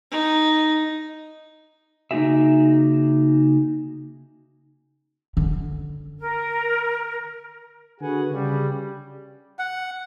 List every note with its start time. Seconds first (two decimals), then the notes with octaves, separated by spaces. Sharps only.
0.11 D#4
2.11 C#3 A#3 D#4 F#4 G#4 E5
5.37 D3 C#4
6.20 A#4
8.01 D3 F#4 G#4 B4 F#5 G#5
8.31 C#3 G3
9.59 F#5